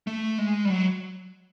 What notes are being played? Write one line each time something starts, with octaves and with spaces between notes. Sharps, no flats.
A3
G#3
G3
F#3